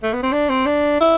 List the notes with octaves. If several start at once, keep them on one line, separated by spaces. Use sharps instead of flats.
A3
B3
C4
D4
C4
D4
E4